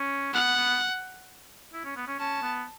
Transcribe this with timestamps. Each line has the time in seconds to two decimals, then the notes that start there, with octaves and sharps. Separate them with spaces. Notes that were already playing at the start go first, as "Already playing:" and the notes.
Already playing: C#4
0.34 B3 F#5
0.57 B3
1.73 E4
1.85 C#4
1.97 B3
2.08 C#4
2.20 C#4 A5
2.43 B3